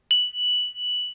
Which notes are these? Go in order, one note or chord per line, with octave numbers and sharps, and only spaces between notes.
F#7